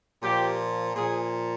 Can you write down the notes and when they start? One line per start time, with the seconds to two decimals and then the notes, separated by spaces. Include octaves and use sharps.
0.22 A#2 F3 G4
0.95 A#2 F3 G#4